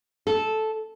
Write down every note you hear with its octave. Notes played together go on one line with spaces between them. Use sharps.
A4